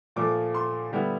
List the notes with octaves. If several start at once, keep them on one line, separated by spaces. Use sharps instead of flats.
A#2 F3 A3 D6
C6
D3 G3 B3 E4